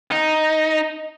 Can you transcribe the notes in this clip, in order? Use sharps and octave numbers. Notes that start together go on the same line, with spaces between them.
D#4